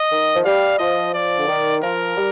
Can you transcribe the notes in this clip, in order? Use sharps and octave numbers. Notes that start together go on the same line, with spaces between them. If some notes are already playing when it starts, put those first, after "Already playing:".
Already playing: D#5
D#3
F3
G3 F5
F3 D#5
F3 D5
D3
D#3
F3 A#4
G3